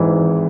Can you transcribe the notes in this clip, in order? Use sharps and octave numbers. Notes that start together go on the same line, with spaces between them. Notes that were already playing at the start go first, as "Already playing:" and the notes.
Already playing: G#1 G#2 E3